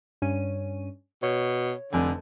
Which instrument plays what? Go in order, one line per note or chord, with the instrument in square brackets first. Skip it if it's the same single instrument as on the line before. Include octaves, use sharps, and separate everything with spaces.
[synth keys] G2 C#4 D#7
[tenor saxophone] B2 [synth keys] C#5
[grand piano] F1 F2 G#5 [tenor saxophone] D3